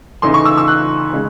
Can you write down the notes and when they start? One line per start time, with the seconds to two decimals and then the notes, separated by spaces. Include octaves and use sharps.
0.22 C#3 E3 A3 D#4 C6
0.34 C#6
0.45 E6
0.57 E6
0.68 F#6
1.13 C#3 G#3